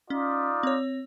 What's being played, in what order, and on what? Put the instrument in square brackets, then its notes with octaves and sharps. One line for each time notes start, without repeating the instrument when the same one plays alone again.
[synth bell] C#4 [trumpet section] D#4 F4 D5
[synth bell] C4 C#5